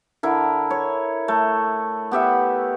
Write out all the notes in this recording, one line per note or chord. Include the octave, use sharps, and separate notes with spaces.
D3 E4 A#4
C#5
A3
B3 G4 E5 F#5